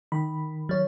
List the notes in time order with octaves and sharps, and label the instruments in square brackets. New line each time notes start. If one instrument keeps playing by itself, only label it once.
[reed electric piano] D#3 [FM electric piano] B5
[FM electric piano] F#3 C#5